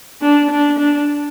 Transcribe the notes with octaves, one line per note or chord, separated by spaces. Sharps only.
D4
D4
D4